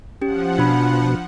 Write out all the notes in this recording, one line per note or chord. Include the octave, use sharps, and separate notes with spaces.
F3 C#4 G4 F#5
B2 D4 B5